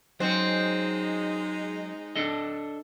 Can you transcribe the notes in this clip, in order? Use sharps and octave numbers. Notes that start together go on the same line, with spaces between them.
F#3 G#3 C4 C#4 D#4
D4 A4 D#5